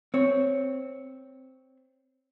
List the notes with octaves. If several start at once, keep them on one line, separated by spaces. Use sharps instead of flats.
C4 C#5